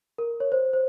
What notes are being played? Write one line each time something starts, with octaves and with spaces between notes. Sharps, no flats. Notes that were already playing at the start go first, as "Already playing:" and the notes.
A#4
C#5
C5
C5